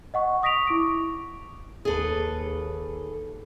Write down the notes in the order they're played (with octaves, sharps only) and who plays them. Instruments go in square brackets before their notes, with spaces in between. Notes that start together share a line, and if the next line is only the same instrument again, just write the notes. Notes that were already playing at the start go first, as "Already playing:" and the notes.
[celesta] D#5 F#5 C#6
C#6 D#6 A#6 B6 D7 F7
E4 C#6 D6 D7
[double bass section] D#2 [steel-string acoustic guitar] G#4 A4 B4